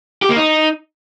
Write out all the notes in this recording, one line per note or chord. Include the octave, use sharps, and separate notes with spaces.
G4
A#3
D#4